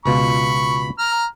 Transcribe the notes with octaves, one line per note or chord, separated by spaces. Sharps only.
C#2 B2 F4 B5 C#6
A#5 F6